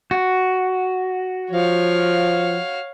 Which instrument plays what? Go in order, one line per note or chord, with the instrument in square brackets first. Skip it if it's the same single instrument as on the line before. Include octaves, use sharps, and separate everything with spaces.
[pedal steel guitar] F#4
[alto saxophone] F3 [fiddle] C#5 F5